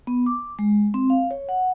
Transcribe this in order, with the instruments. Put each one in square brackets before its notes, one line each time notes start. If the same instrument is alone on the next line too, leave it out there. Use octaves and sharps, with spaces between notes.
[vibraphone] B3
D6
G#3
C4
F5
C#5
F#5